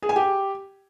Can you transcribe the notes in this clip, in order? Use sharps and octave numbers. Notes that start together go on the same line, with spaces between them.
G#4
G#5
G4